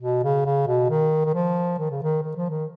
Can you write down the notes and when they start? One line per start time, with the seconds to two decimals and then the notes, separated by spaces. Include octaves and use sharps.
0.02 B2
0.24 C#3
0.46 C#3
0.67 B2
0.90 D#3
1.25 D#3
1.35 F3
1.79 D#3
1.91 C#3
2.03 D#3
2.23 D#3
2.36 F3
2.49 D#3